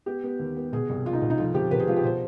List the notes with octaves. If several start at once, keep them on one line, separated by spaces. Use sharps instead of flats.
B3 G4
B3
D#2
B3
B2 G#4
C2
C2 F4
D#4
B2
D#4
F2 F4
C3 G4
C3 B4
G#4
F3 F4
G4
B2 C5